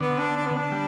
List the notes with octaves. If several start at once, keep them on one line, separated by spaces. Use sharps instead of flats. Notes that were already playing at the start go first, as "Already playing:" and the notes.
D3 B3
D4
D4
B3
D4
G3